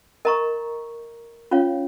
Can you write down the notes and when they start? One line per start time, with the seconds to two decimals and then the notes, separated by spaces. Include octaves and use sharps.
0.25 A#4 D#5 A#5 C#6
1.51 C#4 F4 C#5 F5